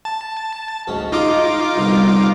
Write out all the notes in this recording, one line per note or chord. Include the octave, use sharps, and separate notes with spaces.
A5
D2 G#2 C#4
G#3 D#4 F4 D#5 D6
C2 B2 D3